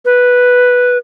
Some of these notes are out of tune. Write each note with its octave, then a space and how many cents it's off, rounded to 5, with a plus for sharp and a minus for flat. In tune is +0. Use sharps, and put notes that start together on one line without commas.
B4 -5